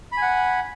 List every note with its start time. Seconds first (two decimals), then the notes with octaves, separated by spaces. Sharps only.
0.12 B5
0.17 G#5
0.22 F#5